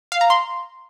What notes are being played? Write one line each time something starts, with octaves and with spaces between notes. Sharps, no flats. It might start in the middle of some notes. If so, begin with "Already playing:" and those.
F5
A#5
C6